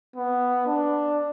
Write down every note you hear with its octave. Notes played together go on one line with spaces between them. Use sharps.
B3
D4